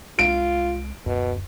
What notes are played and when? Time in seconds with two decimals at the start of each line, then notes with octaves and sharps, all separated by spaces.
0.19 C2 G#3 F4 D7
1.06 D1 F#2 B2